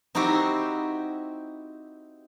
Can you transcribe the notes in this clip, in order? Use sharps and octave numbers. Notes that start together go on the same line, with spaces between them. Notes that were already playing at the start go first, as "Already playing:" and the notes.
C4 D#4 E4 F#4 G4 C5